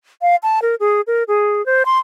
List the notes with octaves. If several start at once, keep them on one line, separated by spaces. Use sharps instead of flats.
F5
A5
A#4
G#4
A#4
G#4
C5
C6